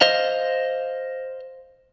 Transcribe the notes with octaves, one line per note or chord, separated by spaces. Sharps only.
C5 D#5 F5